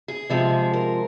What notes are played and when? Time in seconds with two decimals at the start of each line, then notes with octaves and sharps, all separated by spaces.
0.08 G#4
0.30 C3 F3 G#3
0.73 A#4